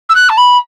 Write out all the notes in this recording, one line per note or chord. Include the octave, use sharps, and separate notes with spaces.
E6
F#6
A5
B5